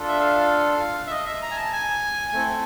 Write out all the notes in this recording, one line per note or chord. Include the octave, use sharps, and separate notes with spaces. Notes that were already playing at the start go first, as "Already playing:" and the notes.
Already playing: D4 F4 A4
E5
F5
E5
D#5
E5
A#5
G#5
A5
G#5
A3 C4 E4 A4